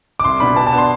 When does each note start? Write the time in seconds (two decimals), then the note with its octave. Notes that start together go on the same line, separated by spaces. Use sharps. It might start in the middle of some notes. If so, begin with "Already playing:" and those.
0.20 D6
0.24 C2 C6
0.40 B2 B3 D4 B5
0.56 B2 A5
0.67 A5
0.73 B3 D4 C6